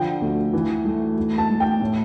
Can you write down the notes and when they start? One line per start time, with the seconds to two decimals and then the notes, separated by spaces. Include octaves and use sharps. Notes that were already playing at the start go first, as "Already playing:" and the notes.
Already playing: D3 F3 G5
0.22 D2
0.53 E3
0.85 A3
1.17 A3
1.38 A5
1.49 A3
1.60 G5
1.81 A2